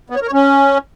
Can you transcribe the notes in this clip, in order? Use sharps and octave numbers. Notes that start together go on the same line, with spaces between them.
B3
C#5
A#4
C#5
C#4